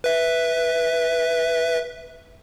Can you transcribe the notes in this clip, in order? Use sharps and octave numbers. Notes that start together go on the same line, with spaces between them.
B4 E5